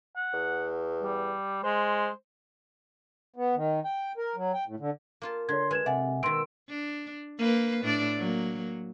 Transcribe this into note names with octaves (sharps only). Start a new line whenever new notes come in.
F#5
E2
G3
G#3 C5
B3
D#3
G5
A#4
F#3
G5
A2
D3
A#3 F4 A5
D3 C#5 C6 G#6
G#3 B4 G#6 E7
C3 D5 E5 F#5 G#5
B2 D#3 C6 E6 D7
D4
A#3 B4
A2 D4 D5
F#3 A#3